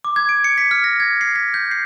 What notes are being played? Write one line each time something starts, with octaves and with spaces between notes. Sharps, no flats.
D6
G#6
D7
C#7
B6
F6
A#6
G#6
C7
B6
G6
C7